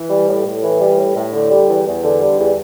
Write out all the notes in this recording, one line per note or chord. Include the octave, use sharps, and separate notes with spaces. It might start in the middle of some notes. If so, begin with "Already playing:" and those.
Already playing: E3
G3
A2
A2
E3
G3
A2
A2
D3
G3
E2
E2
D3
G3
E2